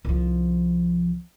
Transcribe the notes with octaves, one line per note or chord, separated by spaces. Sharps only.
C2 F3